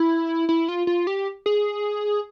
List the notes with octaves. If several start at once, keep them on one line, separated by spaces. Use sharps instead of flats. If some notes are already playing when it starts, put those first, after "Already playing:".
Already playing: E4
E4
F4
F4
G4
G#4